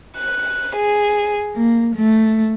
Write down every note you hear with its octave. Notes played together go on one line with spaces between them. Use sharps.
F#6
G#4
A#3
A3